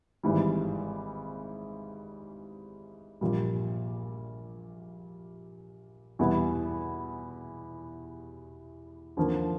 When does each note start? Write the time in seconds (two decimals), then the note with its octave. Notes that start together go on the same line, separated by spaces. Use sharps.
0.23 G#1 G#2 E3 G3
3.21 A#1 A#2 G3
6.19 E2 B2 G3 B3 E4
9.17 D#2 D3 F3 A#3